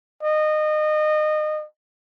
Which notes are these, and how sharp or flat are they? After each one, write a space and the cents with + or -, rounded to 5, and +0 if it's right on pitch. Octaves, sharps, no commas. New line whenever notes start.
D#5 -25